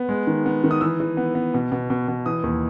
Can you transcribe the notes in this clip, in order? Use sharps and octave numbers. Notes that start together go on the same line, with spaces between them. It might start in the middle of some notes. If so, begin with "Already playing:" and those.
Already playing: B3
G#3
D#3
B3
D#3
D#6
E3 E6
E3
B3
B3
B2
B2
B2
B2
E3 D#6
D#2